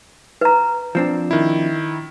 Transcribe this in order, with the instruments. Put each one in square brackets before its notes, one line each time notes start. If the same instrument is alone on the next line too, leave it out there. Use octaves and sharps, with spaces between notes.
[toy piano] B4 A#5
[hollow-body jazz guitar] F3 C4 D4
[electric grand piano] D#3 E4